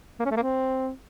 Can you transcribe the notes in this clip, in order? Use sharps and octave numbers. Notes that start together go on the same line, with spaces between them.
A#3
C#4
A3
A#3
C4